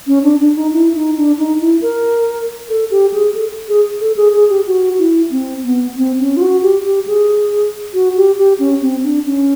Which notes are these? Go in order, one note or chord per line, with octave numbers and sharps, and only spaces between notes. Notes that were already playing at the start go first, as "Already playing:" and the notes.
C#4
D4
D4
D#4
E4
D#4
D4
D#4
E4
A#4
A4
G4
G#4
A4
G#4
A4
G#4
G#4
G4
F#4
E4
C4
B3
C4
C#4
F4
F#4
G4
G4
G#4
F#4
G4
G4
C#4
C4
D4
C#4